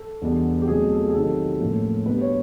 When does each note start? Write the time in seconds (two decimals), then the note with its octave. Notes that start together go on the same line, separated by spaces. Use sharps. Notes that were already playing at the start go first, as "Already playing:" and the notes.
Already playing: A4
0.22 E2 B2 G3 B3 D4
0.62 G4
0.67 B2 F#3 A3 C4 G#4
0.91 A4
1.08 G#4
1.13 C3 D#3 F#3 A4
1.60 A2 F3 A#3 C#4
2.05 B2 G3 B3 D4 B4
2.21 C#5